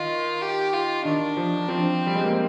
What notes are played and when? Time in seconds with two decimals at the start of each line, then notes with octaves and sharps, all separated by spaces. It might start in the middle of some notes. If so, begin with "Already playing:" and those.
Already playing: D#3 F4
0.41 G4
0.73 F4
1.05 D#3 D4
1.37 F3
1.69 F3 C4
2.07 G3
2.15 G#3
2.24 A#3
2.33 C4